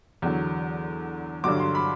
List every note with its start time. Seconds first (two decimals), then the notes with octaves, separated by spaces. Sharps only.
0.22 E2 D3 F#3
1.44 G2 D3 F#3 D6
1.59 C6
1.75 B5